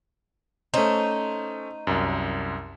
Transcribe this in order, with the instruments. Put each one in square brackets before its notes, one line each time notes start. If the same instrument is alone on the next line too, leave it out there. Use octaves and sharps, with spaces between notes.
[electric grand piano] A3 C#4 C5 [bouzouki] D#4
[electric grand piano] C2 F#2